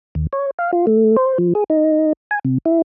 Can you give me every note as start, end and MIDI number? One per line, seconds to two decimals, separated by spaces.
0.15 0.27 39
0.33 0.51 73
0.59 0.71 77
0.73 0.86 65
0.87 1.16 57
1.17 1.38 72
1.38 1.53 53
1.55 1.64 68
1.70 2.13 63
2.31 2.39 80
2.45 2.58 48
2.65 2.82 64